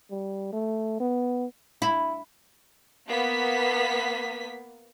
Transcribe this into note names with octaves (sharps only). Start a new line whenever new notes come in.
G3
A3
B3
E4
A#3 B3 B6